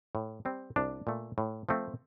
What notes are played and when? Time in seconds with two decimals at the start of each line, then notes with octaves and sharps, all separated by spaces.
0.15 A2
0.45 G3 C4
0.76 C2 D4
1.07 A#2 A3
1.38 A2
1.69 F3 A3 C4